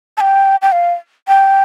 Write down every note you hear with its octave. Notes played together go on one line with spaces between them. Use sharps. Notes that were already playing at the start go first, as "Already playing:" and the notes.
A5
G5
G5
F5
G5